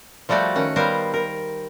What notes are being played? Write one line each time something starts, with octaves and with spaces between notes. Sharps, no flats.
F3 G3 A3 F#4 D5
D#3 C#4 F#5
G3 B3 A#4 C5 F5
A#4